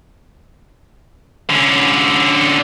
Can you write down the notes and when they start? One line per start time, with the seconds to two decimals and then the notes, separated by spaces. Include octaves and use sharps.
1.50 D3 C#4